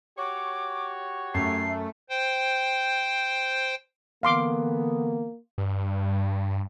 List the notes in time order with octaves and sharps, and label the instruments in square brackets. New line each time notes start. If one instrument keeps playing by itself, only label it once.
[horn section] F#4 G4 C#5 [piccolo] D6
[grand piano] F#2 [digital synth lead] A3 [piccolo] C7
[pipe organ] C5 G5
[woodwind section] D3 E3 B3 [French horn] A#3 [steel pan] F5 C6 D6
[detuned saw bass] G2